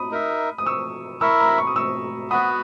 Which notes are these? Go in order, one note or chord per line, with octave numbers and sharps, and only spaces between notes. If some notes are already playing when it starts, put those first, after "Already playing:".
Already playing: B5 D#6
D#4 A#4 E5
D#6
C#6 E6
E4 A#4 E5 C#6 E6
A#5
B5
C#6
D#6
C#6 E6
B3 F#4 B4 B5 D#6